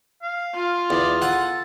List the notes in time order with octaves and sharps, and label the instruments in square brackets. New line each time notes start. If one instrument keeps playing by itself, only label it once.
[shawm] F5
[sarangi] F4
[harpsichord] E2 [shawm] D5
[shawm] A4 [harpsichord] F#5 G#5